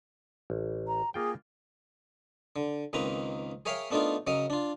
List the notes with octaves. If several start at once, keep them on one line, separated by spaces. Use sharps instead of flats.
A1
A#5
A#3 F4 G#4 G5
D3
C#2 D#3 A#3 C4 B4 A#5
G#4 A#4 C#5 E5 F5 G5
A3 B3 D4 D#4 F4 A#4
C#3 F#3 A#4 D#5
D4 F4